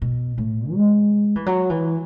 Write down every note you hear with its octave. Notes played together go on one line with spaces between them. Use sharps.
B2
A2
G#3
E3
F#3
E3